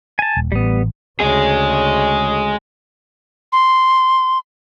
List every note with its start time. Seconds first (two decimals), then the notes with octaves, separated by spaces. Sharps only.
0.19 G#5 A5
0.37 D#1
0.52 A1 G3 B3
1.20 D2 C#3 G#3 G#4
3.52 C6